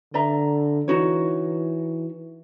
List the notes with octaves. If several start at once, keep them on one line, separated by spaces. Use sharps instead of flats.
D3 D5 E5 A#5
E3 D#4 F#4 C#5